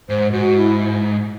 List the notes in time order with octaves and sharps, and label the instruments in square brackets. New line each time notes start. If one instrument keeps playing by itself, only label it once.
[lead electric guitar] G#2 [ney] C5
[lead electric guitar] G#2 [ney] F#4
[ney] E4